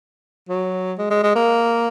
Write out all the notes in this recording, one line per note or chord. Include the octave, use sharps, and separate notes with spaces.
F#3
G#3
G#3
G#3
A#3